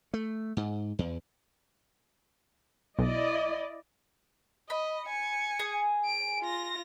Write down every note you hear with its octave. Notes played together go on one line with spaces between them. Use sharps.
A3
G#2
E2
B1 E4 D5 D#5
D#5 B5
G#5 C#7
G#4
D7
F4 A#6